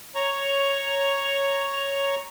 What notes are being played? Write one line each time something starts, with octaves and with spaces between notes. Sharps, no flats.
C#5 A#5 C#6